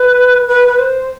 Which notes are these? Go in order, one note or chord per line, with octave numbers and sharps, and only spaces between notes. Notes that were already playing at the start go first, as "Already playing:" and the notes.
Already playing: B4
B4
B4
C5